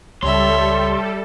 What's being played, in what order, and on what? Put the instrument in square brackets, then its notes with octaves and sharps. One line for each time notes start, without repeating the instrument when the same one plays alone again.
[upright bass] C#2 [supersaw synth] G3 A4 [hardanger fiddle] C#5 E5 [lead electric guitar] C6